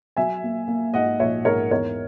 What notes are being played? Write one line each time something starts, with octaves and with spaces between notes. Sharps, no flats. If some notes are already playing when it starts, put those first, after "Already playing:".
F#3 E5 G#5
A#3
A#3
G#2 D#5 F#5
A#1 C#5 E5
G#2 A#4 C#5
E2 A#4 C#5